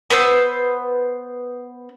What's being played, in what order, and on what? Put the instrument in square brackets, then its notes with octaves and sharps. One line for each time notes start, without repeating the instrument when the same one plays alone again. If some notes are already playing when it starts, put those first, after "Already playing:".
[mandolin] B3 B4 C5 E6